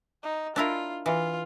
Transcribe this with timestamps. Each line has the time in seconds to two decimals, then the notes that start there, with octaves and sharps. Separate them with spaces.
0.24 D#4
0.56 D4 E4 F4 A#4
1.06 E3 F4